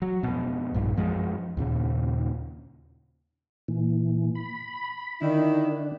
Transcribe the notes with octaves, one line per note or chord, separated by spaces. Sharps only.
F#3
F2 B2
A#1 G2
F#2 F3 G#3
D#2 A#2 C#3
A#2 E3
B5
D3 D#3 D4 E4